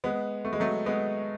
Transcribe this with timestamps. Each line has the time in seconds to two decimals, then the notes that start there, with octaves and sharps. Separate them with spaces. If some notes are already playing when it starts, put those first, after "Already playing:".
0.04 G#3 B3
0.45 A3
0.53 G#3
0.60 F#3 A3
0.86 G#3 B3